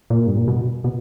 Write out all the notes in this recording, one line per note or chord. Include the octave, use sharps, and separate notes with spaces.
A#2
G2
A#2
B2
B2